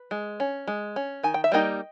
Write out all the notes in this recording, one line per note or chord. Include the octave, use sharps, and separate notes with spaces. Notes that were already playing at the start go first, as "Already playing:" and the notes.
Already playing: B4
G#3
C#4
G#3
C#4
D#3 G#5
G5
E5
G3 A#3 D#4 D#5 G5